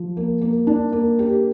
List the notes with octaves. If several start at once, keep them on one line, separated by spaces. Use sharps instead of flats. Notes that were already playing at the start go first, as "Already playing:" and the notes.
Already playing: F3
A#3
A#3
D4
A#3
G4